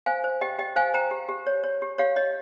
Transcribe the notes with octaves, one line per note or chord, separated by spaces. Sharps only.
C5 F5 G#5
C5
G4 D#5 G5
G4 D#5 G5
C5 F5 G#5
C5 G5 A#5
G4
G4
C#5
C#5
G4
G4 C#5 F5
C#5 D#5